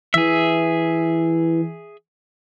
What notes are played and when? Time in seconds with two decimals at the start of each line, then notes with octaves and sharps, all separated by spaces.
0.14 E3 G#4 E5